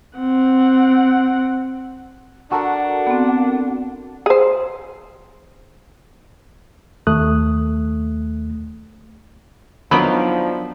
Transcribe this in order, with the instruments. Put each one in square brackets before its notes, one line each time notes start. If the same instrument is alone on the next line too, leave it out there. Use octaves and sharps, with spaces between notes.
[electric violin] C4 F#5
[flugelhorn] D4 [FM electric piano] F#4 A4 A#4 [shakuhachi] F#5
[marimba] B3 C4
[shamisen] G#4 C5
[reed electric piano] D#2 A3 D#6 F#6
[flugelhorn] F3 [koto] F#3 B3 [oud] D4 D#4 A#4 [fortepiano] B5